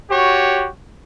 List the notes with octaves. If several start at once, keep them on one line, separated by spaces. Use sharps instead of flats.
F#4 G4 C#5